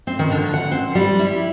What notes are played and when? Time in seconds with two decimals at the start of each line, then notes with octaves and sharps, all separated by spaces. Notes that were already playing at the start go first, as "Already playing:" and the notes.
0.07 C4
0.19 D#3
0.31 D3
0.53 F#5
0.71 C4
0.95 G3
1.19 E4